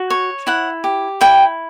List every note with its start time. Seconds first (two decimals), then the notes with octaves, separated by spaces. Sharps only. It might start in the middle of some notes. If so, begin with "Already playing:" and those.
Already playing: F#4
0.10 C#5
0.47 E4 F#5
0.84 G4
1.21 E4 G5